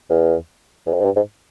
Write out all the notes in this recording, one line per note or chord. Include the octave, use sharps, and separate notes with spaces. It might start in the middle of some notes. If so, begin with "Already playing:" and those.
E2
E2
F2
G#2
G2
G#2